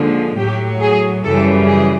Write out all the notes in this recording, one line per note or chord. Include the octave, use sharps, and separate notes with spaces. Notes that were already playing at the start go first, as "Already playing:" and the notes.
Already playing: D#2 D3 F3 G#3
A2 F#3 G4
G#4
F#2 C#3 E3 G3 A4
G#4